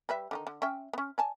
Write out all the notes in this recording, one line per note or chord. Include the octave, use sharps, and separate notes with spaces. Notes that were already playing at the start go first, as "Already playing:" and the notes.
G3 B4 E5
D3 D#3 D#4
D3
C#4 E5 G5
B3 C#4
D5 G#5 A5